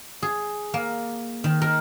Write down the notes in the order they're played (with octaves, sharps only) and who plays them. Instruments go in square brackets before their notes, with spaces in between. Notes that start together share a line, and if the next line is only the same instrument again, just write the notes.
[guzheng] G#4
A#3
D#3
A#4